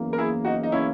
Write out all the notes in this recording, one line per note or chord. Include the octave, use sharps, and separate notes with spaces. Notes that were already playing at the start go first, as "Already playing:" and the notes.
Already playing: F#1 E2 C#3 E3 A#3
A#4
E4 G#4
D#4 F#4
D#4
C#4 E4